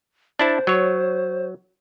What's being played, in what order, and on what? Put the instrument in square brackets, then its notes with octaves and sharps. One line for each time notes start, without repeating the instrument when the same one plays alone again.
[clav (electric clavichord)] D4 E4 A5 [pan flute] C5
[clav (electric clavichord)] F#3 C#5